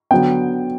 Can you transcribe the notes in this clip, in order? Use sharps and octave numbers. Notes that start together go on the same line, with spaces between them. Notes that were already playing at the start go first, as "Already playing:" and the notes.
D3 F#3 B3 G5